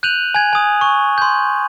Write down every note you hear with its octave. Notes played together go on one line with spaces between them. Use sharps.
F#6 G6 D#7 F7 F#7
G#5 G#6
G#5 D#6
C#6
C6 G6